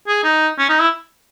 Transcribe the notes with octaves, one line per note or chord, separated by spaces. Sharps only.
G#4
D#4
C#4
D#4
E4